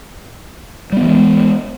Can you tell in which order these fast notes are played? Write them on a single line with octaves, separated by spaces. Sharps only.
G3 B3 E3 G#3